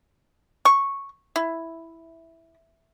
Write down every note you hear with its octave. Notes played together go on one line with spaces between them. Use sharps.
C#6
E4